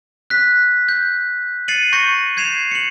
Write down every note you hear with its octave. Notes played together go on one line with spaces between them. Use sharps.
F#6 B6
G6
A6 C7 C#7 D#7 F#7
C#6 G6 A#6 C#7
G6 G#6 C7 E7 F7
C#7 F#7